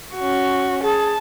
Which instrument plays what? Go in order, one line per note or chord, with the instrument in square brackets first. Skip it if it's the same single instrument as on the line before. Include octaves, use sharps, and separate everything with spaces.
[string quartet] C#4 F#4
[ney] G#4 [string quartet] A5